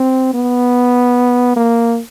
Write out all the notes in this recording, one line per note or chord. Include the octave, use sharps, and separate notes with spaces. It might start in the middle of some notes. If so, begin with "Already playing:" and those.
Already playing: C4
B3
A#3